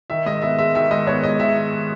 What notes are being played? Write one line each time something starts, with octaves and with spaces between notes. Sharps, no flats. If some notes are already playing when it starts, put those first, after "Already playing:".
D#3 E5
G#2 D#5
B3 E5
G#3 E5
D#3 E5
G#2 D#5
B3 C#5
G#3 D#5
D#3 E5